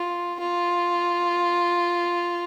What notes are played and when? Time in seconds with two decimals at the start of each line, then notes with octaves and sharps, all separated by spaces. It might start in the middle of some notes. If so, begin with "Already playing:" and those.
Already playing: F4
0.39 F4